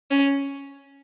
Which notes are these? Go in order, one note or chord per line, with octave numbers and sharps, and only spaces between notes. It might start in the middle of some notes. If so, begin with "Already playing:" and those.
C#4